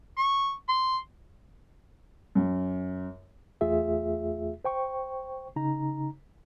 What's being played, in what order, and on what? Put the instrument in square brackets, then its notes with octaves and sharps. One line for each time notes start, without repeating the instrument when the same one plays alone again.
[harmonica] C#6
C6
[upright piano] F#2
[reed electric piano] E2 A3 F4 G#4 E5
C5 G5 C#6
C#3 D#4 A#5